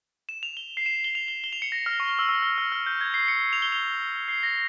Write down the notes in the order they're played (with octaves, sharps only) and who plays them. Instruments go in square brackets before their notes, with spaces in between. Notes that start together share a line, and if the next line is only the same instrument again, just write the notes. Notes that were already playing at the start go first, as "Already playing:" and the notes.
[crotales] E7
F7
G7
C7
E7
G7
F7
G7
G7
F7
C#7
A#6
F6
C#6
F6
E6
E6
F6
F6
F6
G6
G#6
C7
C#7
F7
G7
F7
C7
A#6